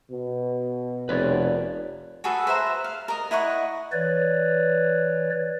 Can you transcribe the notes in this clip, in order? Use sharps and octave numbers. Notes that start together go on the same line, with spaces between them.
B2
F1 B4 C#5 D5
F#4 G#4 A4 B4
B4 C5 E5 A#5
F5
A#4 D#5
E4 D#5 F#5 C#6
E3 B4 C#5 D5